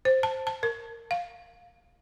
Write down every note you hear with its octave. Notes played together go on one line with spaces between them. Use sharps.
C5
A5
A5
A#4
F5